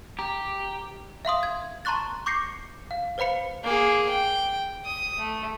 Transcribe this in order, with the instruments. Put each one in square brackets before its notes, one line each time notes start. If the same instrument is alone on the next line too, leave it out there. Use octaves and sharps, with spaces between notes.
[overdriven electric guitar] G4 [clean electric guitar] A#5
[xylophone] E5 F5 C6 D#6
G#6
A5 A#5 C6 C#6 F#6 A6
C#6 D6 G6 A#6 C7 C#7
F5
B4 C5 F5 B5 C#7
[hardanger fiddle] A#3 G#4
G5
D#6
A3